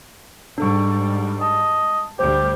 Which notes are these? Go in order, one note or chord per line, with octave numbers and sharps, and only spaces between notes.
G#2 G3 D4 A4 C#6
D#5 A5
D2 G3 G4 C5